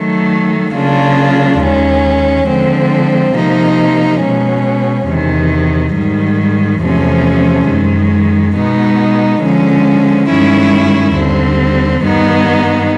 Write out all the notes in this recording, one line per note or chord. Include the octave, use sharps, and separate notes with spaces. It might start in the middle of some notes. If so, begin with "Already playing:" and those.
Already playing: D#3 F#3 A3
C#3 F#3 A#3 D4 F4
D#2 D#3 G#3 C#4
D3 F3 G#3 C4
C3 F3 A#3 D#4
B2 G#3 C#4
E2 C3 D#3
G#2 D#3 G3
E2 C3 F3 A3 C#4
F#2 D#3 G#3
B2 G#3 B3 D#4
D3 F3 G#3 C#4
G2 D#3 G#3 C#4 E4
D#2 D3 G3 C4
G2 D#3 G3 B3 D#4